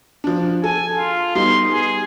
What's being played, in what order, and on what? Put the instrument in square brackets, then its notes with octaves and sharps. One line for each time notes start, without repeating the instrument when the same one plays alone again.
[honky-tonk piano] F3 D4
[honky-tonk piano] A4 [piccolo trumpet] G#5
[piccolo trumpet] F4
[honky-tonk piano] G3 B3 D#4 [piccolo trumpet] C6
[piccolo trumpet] G#4